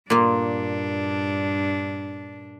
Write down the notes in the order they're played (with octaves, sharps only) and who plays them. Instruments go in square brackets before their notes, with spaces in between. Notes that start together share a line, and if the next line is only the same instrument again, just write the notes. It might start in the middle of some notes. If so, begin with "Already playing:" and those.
[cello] G2 D4 [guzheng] A#2 A#3